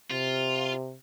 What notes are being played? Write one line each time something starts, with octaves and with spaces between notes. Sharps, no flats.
C3 F4